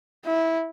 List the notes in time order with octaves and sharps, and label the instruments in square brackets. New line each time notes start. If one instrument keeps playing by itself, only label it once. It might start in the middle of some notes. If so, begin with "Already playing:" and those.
[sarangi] E4